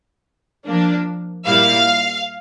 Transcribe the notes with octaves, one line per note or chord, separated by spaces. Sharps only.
F3 A#3 D4
A#2 G3 A#3 E4 F5